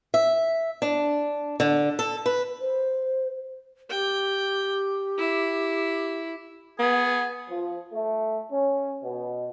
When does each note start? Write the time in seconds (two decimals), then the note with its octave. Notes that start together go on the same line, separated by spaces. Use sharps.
0.14 E5
0.82 D4
1.60 D3
1.99 A4
2.26 B4
2.61 C5
3.90 G4 G5
5.18 E4
6.79 B3 G#4
7.49 F3
7.91 A3
8.50 C#4
9.02 B2